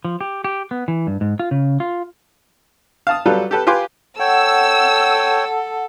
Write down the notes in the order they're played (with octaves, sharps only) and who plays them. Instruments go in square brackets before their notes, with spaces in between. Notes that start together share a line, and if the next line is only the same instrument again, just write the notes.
[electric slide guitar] F3
G4
G4
B3
E3
G2
G#2
F4
C#3
F4
[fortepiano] F5 A5 D#6
F#3 G3 F4 A4 B4
G4 A4 B4
F4 G4 B4 G#5 C6 D6
[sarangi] A4 [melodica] C#5 G5 [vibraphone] F#5 [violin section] E6